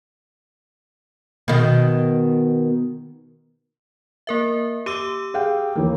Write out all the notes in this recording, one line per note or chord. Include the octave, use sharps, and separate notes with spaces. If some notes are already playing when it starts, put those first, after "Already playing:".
B2 D#3
A#3 A#4 E5
G4 D6 E6 D#7
G#4 F5 G5
D#2 E3 A#3